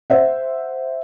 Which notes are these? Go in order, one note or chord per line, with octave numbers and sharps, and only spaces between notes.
C5 E5 F#5